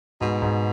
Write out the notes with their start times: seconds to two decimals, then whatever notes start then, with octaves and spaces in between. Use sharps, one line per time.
0.21 G#2 B2
0.42 G#2